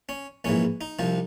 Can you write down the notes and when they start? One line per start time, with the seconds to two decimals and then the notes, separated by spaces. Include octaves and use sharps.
0.09 C#4
0.44 A#1 G#2 E3 C#4
0.81 D#4
0.99 C2 C3 F3